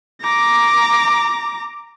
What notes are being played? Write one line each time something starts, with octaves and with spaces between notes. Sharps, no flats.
A#5 D6